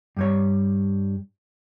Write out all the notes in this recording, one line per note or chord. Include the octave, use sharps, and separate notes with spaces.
G2 G3 C#5